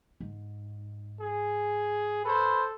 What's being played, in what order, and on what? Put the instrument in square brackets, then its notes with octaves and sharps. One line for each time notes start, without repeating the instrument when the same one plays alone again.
[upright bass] G#2
[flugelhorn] G#4
[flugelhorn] A4 [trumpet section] B4 C5